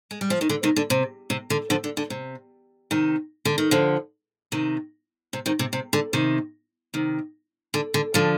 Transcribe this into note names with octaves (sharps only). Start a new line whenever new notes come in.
G#3
G3
F3
D#3
D3
C3 D#3
D3
C3
C3
D3
D3 F3
D3
D3
C3
C3 D#3
D3
D#3
D3 F3
C3 D#3
C3
C3 D#3
C3
C3
D3
C3 D#3
C3 D#3
D3
D3
D3 F3